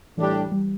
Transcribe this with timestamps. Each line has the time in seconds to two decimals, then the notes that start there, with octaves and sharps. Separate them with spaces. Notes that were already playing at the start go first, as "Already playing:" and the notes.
0.17 A2 E3 G3 D4 G4
0.52 G3